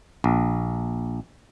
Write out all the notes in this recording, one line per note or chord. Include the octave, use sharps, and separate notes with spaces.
A#1